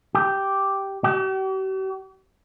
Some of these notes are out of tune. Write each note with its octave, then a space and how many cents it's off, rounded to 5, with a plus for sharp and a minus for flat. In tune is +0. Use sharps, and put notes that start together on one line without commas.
G4 -5
G4 -45